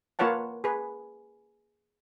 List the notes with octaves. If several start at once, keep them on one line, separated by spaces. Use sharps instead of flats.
A#3 F4 B4 C#5 F#5 A5
G#4 B4